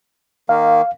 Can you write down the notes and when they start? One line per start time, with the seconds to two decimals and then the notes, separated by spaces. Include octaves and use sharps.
0.49 D#3 A#3 F5